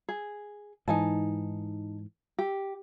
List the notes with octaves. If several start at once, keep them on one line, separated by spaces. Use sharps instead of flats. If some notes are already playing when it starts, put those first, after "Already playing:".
G#4
G#2 E3 D#4 G#5 A5
G4